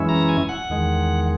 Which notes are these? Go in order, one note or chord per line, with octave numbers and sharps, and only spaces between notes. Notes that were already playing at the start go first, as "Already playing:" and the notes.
Already playing: F#2 E3 G#3 C#4 E4
A#5
G#5
F#5
E2 D#3 G#3